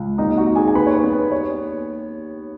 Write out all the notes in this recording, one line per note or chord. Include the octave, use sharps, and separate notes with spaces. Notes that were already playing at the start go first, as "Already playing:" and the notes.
Already playing: C#2
D#2 D#4 D#5
F#4 F#5
D#4
G#4 G#5
G#5
D#2 B4 B5
C#5
B4
B3
B4
C#5